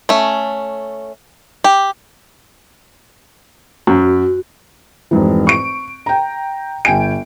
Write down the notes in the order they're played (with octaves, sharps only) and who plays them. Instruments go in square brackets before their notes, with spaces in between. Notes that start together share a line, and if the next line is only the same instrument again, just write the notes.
[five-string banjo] A3 C#4
G4
[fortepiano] F#2 [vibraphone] F#4
[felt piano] F1 G#2 E3
C#6 D7
G5 A#5
G1 G5 G#5 D7